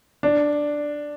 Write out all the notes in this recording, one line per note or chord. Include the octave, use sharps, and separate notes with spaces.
D4